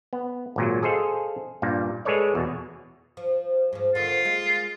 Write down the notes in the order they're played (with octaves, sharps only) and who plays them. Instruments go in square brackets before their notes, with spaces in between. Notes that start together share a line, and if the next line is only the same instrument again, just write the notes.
[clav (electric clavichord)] B3
G#1 A#2 F#3
G#4 A4 C5 D#5 F5
G2 A#2 G3 A#3
G#3 G#4 A4 B4 C#5 D5
E2 B2
[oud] F3
G#2 F3
[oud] D3 D#3 [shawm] F4
[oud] G#3 A#3